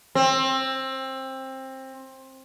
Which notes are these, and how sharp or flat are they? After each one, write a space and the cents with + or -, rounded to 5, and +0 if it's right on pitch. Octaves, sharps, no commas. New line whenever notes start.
C4 +20